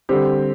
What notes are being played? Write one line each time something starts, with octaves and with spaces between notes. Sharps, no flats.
D3 G3 C4 G4